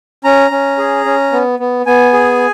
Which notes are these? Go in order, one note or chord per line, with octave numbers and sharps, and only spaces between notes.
C#4 A#5
C#4
G#4
C#4
B3
B3
B3 G#5
G#4